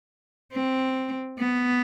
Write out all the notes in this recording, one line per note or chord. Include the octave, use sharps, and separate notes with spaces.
C4
B3